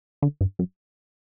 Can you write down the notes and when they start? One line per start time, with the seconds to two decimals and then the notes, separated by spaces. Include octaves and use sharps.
0.22 D3
0.41 G2
0.59 F#2